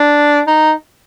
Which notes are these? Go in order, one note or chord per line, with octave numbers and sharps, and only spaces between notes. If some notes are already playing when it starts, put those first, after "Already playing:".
Already playing: D4
D#4